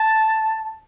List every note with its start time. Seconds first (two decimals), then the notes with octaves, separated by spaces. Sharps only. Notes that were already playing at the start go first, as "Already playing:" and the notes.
Already playing: A5